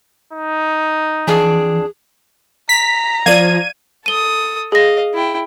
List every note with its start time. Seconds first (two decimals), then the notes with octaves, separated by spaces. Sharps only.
0.34 D#4
1.28 F2 E3 D4 G#4 G#5
2.69 A#5 B6
3.26 F3 D5 F5 G#6 D#7
4.06 A4 D#6 D#7 G7
4.72 G#4 D#5 F5 A#6
5.14 E4 G5